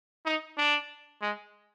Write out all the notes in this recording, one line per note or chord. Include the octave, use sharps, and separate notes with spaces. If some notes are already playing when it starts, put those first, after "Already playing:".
D#4
D4
G#3